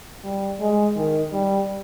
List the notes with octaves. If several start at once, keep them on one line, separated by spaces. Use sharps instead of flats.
G3
G#3
D#3
G3